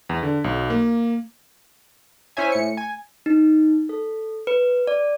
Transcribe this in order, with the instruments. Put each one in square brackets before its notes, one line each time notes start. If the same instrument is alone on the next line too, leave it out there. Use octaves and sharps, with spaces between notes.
[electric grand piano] E2
D3
B1
A#3
[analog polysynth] C#4 E4 C5 C#5 E5 G#5
A2 C#7
G#5
[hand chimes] D#4
A4
B4
D5